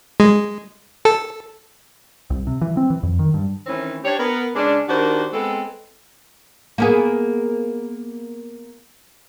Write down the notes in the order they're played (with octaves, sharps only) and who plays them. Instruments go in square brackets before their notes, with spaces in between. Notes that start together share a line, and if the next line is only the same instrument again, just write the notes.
[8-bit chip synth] G#3
A4
[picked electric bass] C2
C3
E3
C4
E3
F2
D#3
G2
[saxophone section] D#3 E3 A3 C4 C#4
D4 G4 C5 C#5
B3 A#4
C#3 G#3 C#4 D4
D#3 D4 F#4 G4 A#4 C5
G#3 B3 C4 A4
[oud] A#3 B3 G#4